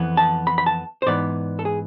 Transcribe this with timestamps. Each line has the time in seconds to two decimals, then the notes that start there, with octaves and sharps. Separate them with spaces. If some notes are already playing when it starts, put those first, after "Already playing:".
Already playing: F2 E3 B3
0.17 A5
0.47 B5
0.58 B5
0.66 A5
1.02 C5
1.06 G#2 E3 B3 D5
1.59 A4
1.65 G#4